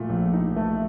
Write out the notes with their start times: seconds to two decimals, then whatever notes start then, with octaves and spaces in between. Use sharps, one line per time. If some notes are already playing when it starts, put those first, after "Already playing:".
Already playing: A#2 A3
0.09 A#1
0.33 D#4
0.56 A3